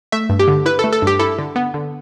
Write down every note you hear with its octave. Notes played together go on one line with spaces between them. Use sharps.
A3 E5
G2
G4
D3
E4 B4
A4
A3
A4
G2 G4
E4 A4
D3
B3
D3